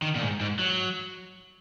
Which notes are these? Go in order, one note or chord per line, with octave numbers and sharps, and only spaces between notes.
D#3
A#2
G#2
G#2
F#3